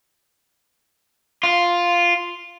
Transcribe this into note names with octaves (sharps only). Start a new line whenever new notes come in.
F4